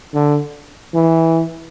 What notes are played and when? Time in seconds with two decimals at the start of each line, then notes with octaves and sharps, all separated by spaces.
0.14 D3
0.95 E3